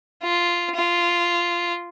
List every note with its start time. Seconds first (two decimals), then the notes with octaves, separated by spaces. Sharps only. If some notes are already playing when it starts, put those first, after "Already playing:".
0.23 F4
0.75 F4